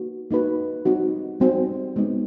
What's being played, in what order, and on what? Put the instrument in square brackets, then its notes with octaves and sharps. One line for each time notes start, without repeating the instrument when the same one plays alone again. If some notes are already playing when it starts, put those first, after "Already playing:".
Already playing: [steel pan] A#3 D#4 F#4 B4
A#3 D#4 F#4 B4
G3 C4 D#4 F#4
G3 C4 D#4 F#4
G#3 B3 D#4